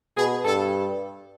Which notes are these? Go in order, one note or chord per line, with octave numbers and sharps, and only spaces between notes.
B2 G#4
G2 A4